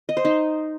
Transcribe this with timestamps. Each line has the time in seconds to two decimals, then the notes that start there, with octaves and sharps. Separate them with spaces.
0.09 D#5
0.17 C5
0.25 D#4